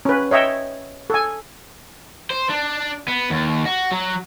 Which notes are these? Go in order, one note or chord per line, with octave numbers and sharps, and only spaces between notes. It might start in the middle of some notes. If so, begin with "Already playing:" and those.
C#4 B4
C#5 D#5 E5 G5
A4 G#5
C5
D4
B3
D#2
F#4
F#3